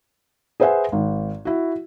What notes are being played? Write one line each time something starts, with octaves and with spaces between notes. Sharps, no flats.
G#4 B4 C5 E5 F#5 G#5
G#1
E4 F#4